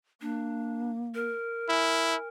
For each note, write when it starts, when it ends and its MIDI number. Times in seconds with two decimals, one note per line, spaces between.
0.21 1.27 58
0.21 0.91 62
1.14 2.28 70
1.69 2.15 64
1.69 2.26 80